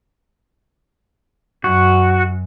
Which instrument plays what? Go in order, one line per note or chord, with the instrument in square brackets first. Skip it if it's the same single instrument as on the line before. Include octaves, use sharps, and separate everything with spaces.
[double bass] F#2 [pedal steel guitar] F#4